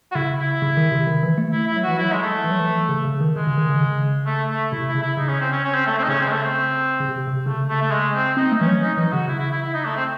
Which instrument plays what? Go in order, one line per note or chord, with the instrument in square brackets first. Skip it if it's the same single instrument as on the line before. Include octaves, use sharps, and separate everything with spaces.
[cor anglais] F#4
[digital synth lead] C#3 [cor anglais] E4
[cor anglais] E4
[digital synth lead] C#3
D#3
C3
D#3
E3
A3
[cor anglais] E4
E4
[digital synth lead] F#3
[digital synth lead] E3 [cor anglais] F#4
[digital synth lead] F#3 [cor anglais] E4
[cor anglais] G#3
A3
[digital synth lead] E3
F#3
E3
C#3
C#3
D#3
[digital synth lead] C#3 [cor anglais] G#3
[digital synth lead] C#3
D#3
C#3
C#3
[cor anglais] A3
A3
[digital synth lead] C3 [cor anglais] E4
[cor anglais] E4
[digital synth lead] C#3
[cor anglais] E4
[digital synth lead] C#3 [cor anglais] D#4
[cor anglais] C#4
C4
C#4
C#4
C4
A3
C4
D#4
[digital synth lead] C#3 [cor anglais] C#4
[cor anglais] C4
G#3
A3
C4
[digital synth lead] C#3
C3
C3
[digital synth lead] C#3 [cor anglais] A3
[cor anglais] A3
A3
G#3
C4
[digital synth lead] C4 [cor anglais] D#4
[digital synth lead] A3
[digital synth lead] E3 [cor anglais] C#4
[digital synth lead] F#3
[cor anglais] D#4
[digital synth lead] E3 [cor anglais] D#4
[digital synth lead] C#3 [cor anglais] F#4
[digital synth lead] C#3 [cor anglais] E4
[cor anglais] E4
E4
E4
D#4
A3
C4